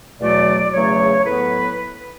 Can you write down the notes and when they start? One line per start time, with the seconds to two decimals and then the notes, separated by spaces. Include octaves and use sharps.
0.20 E2 B2 F#3 A3 D5
0.72 E2 C#3 F#3 A3 C#5
1.25 A2 F#3 B3 B4